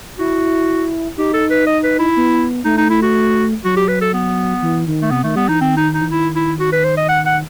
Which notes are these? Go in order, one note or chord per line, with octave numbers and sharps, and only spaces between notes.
E4 F#4
D#4 G4
A4
B4
D#5
B4
E4
B3
A3 D#4
D#4
E4
F#4
F#3 F#4
G4
B4
A4
B3
E3
D#3
A3
C3 B3
D#3 A3
G3 B3
E3 D#4
D#3 C4
D#4
D#4
E3
D#3 E4
E4
F#4
B4
C5
D#5
F#5
F#5